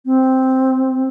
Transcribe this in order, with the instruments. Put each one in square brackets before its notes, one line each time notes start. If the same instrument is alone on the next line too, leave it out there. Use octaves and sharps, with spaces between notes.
[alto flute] C4